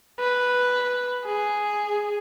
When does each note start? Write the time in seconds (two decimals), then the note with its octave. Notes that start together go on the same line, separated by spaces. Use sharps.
0.20 B4
1.26 G#4